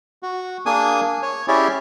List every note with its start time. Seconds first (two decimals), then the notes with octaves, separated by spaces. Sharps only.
0.23 F#4
0.66 A#3 D4 G#4 G#5 D#6
1.23 C#5
1.48 C#4 E4 G4 G#4 C#5 D5